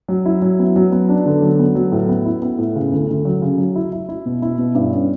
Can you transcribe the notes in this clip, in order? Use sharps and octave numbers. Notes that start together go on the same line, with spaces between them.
F#3
E4
F#3
B3
F#3
B3
D4
D3
F#3
B3
F#3
A2
B3
E4
B3
A2
C#3
D2
D2
F#3
C#3
F#3
E4
E4
E4
B2
E4
B2
G2
C#4